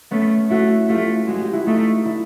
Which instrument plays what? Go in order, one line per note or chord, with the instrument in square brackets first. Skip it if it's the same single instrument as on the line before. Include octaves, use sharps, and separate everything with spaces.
[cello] A3 [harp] B3 C#4
[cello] A3 [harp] E4 F#4
[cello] A3 [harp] F4 G4
[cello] G#3 [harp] F#4
[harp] G4
E4 F#4
[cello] A3 [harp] D#4 F4
[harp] D4 E4